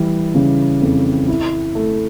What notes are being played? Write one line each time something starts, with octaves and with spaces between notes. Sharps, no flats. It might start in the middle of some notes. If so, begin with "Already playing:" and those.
Already playing: E3 G3
C#3
F2
E4
A3